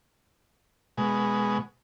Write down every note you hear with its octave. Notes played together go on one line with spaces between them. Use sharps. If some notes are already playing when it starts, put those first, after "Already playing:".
B2 G#3